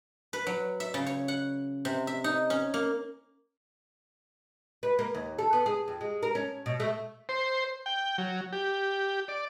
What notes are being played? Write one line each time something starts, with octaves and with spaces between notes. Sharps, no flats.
B4
F#3
E5
C#3
C#5
F#5
C3
E5
D#4
C#4
A#3
B4
A#3
D#2
A4
B3
G#4
F2
G#3
A#4
C#4
B2
A3
C5
G5
F#3
G4
D5